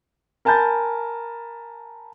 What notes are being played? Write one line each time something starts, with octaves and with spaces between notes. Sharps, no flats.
A#4 G#5 A5 B5 G6 A6